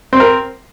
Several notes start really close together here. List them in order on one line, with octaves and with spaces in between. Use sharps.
C4 C5 A#4